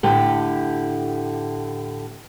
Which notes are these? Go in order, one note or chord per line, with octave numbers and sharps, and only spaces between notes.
A2 D3 G4